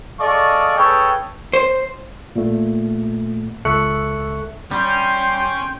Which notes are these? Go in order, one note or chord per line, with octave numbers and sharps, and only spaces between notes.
G#4 A4 D5 D#5 F5 C#6
C#4 G#4 A4 B4 C#5 G5
C5
A#2 A3
C#2 A4 E5 C#6 F#6 C#7
G3 C#4 G5 C6